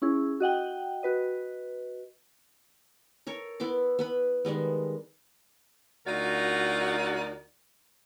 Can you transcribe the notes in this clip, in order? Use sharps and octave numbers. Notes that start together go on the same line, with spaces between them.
C#4 E4 G#4
F#4 D#5 F#5 G5
F#4 B4 D#5
A4 A#4 C#5
B3 E4 C6 D6
B3 B4 B5
D#3 G3 G#3 B3
D2 D#4 F4 F#4 A#4 D5